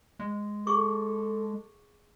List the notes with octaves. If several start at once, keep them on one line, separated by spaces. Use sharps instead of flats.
G#3
G#4 A4 C#6 D6